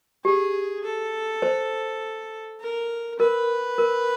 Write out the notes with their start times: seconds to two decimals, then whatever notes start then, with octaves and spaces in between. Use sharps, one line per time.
0.25 G4 G#4
0.84 A4
1.42 C5
2.60 A#4
3.19 A#4 B4
3.78 A#4